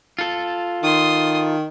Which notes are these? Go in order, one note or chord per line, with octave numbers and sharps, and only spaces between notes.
F4 A4
D#3 C6 D#6